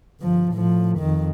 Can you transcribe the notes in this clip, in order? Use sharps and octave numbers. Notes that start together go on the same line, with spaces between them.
G1 F3
A2 F3
F2 D#3